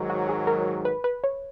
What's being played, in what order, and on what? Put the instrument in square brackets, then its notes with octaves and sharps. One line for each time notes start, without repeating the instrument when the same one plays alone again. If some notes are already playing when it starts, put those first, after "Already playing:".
Already playing: [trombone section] G#2 D#3 F#3
[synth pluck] F#4
G#4
A#4
B4
B4
C#5